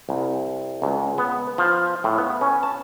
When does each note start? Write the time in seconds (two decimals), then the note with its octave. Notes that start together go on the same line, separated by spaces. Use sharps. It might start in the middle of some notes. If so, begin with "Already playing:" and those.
0.09 C2
0.82 C#2
1.18 B3
1.58 F3
2.04 A2
2.18 B3
2.41 C#4
2.63 A5